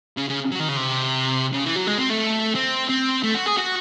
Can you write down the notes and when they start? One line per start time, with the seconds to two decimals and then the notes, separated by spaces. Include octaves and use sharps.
0.17 C#3
0.29 C#3
0.52 F#3
0.60 D#3
0.69 C#3
0.76 C3
1.53 C#3
1.65 E3
1.76 F#3
1.87 G#3
1.98 C4
2.10 A3
2.55 C4
2.89 C4
3.23 A3
3.35 F#4
3.46 G#4
3.57 F#4